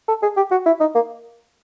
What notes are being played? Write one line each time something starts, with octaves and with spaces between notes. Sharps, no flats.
A4
G#4
G4
F#4
E4
D#4
A#3